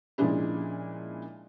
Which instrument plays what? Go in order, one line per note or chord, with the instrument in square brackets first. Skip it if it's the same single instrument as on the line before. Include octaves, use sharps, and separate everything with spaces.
[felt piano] A#2 C#3 F3 G#3 D4 E4